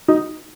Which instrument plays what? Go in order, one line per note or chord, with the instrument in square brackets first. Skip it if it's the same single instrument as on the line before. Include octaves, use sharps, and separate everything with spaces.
[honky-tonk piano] D#4